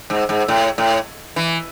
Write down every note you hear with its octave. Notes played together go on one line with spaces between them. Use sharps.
G#2
G#2
A2
A2
E3